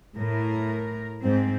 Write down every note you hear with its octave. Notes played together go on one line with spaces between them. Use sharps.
A2 A#4
G#2 C4